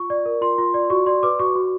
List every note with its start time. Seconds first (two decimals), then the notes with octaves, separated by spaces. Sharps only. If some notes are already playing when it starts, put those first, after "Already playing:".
Already playing: F4 C#6
0.10 D5
0.26 A#4
0.42 F4 C6
0.58 F4
0.74 D5
0.90 F#4 C#6
1.06 D5 C6
1.23 B4 D6
1.39 F#4 C#6
1.55 F#4